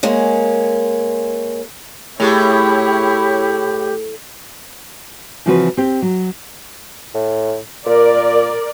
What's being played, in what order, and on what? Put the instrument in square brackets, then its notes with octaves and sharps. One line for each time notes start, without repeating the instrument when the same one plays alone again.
[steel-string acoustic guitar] G#3 A#3 C#4
[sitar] A2 [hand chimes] A3 G#4 [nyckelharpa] E4 C#5 [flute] G4
[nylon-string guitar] C#3 E3 F3 C4 F#4 B4
C4 G4
F#3
[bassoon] A2
[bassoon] A#2 [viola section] A#4 D5